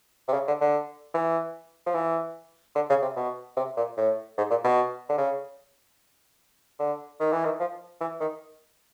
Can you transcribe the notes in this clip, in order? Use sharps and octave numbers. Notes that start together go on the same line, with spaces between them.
C3
C#3
D3
D3
E3
F3
E3
D3
C#3
C3
B2
C3
A#2
A2
G#2
A#2
B2
D3
C#3
D3
D#3
E3
D#3
F3
E3
D#3